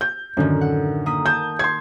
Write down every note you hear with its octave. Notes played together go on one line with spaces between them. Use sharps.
G6
F#2 A2 D3 D#3
F#5
A#3 D#6 B6
A5 D#6 G6
C6 G#6